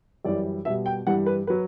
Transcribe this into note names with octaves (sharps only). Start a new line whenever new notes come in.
F#2 E3 G3 D5
B2 G3 E5
G5
G2 E3 G3 F#5
B4
F#3 B4